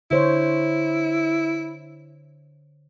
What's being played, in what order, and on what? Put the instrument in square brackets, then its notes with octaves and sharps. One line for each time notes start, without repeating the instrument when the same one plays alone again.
[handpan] D3 C5 C#5 [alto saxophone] E4